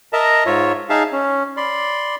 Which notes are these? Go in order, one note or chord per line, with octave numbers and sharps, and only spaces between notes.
A#4 D#5 E5 A5 A#5
G#2 F4 C#5 E5
D#4 G#4 E5 F5 A5
C#4
D5 B5 C6